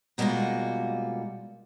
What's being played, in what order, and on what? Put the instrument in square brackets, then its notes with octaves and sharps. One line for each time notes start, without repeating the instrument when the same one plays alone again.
[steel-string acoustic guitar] B2 G3 G#3 A#3 F4 F#4